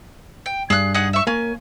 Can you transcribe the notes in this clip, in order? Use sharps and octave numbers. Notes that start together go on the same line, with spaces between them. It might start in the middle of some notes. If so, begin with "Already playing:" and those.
G5
G2 G#4 F#6
D#4 G#4 F#5
E5 C#6
A#3 C#4 G#5